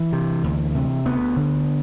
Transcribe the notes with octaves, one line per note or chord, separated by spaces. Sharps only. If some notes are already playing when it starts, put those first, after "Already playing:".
Already playing: E3
C3
D2
C3
D2 B3
D3